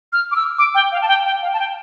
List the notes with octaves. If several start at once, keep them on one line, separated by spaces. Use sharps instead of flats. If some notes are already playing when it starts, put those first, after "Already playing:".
F6
D6
E6
D6
G5
F5
A5
G5
G5
F5
A5
G5